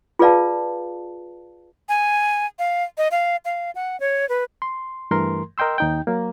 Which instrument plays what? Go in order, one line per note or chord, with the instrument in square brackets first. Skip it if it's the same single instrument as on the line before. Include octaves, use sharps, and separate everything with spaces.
[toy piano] F4 G#4 B4 D5 F5 A5
[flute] G#5
F5
D#5
F5
F5
F#5
C#5
B4
[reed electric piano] C6
G2 E3 A3 A#4 C6
A#4 D#5 G5 C6 E6
D#2 D#4 G5
F#3 A#3